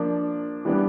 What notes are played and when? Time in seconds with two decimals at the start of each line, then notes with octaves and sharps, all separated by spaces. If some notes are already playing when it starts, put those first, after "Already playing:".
Already playing: F3 A#3 D4
0.65 E3 G3 B3 D4